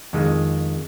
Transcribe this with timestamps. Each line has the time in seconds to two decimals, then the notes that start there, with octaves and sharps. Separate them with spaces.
0.13 F2 D#3 G#3